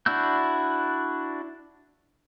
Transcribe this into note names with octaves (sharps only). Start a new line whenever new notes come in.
D4 E4 F#4 E6 G6